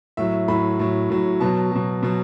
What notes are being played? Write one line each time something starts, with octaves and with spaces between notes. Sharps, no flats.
A2 F#3 E5
A2 F#3 B5
A2 F#3
A2 F#3
B2 F#3 A5
B2 F#3
B2 F#3